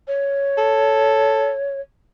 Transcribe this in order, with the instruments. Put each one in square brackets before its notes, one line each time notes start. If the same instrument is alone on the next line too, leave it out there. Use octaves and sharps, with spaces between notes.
[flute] C#5
[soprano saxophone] A4